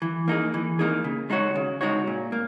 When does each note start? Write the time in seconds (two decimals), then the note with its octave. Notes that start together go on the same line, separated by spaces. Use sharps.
0.02 E3
0.28 A#3 D#4 G#4
0.54 E3
0.79 A#3 D#4 G#4
1.04 C#3
1.30 G#3 D#4 F#4 C#5
1.56 C#3
1.81 G#3 D#4 F#4 C#5
2.07 A#2
2.32 A#3